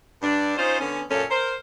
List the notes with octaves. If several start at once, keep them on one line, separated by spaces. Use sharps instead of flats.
G2 D4
C#4 D#4 F4 C5
D3 B3 C#4
F#2 A#2 C#4 A4
A#4 C5